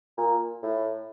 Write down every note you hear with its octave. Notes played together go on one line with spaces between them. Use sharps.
A#2
A2